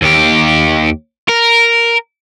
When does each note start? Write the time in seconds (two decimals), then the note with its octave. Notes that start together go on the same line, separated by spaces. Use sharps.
0.02 D#2 G4
1.29 A#4